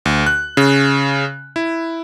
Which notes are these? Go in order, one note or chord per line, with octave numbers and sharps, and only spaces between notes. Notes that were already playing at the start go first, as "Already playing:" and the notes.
D2
F#6
C#3
E4